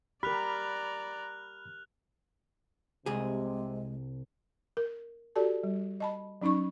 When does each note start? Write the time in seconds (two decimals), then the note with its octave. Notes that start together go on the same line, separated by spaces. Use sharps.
0.23 G4 A#4 D5 A#5 B5 F6 F#6 F7
3.06 C2 C3 G#3 G#4
4.77 A#4
5.36 F#4 G4 A4 D5 A5
5.63 G3
6.00 D#5 A5 B5
6.42 F#3 C#4 D#4 B5 C#6